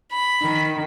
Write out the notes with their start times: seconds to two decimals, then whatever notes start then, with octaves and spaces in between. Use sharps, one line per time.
0.12 B5
0.42 D#3